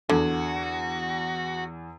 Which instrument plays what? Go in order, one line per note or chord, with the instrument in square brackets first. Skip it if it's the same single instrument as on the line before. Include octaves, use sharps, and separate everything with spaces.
[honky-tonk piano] E2 G#6 [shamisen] D3 [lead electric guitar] F#4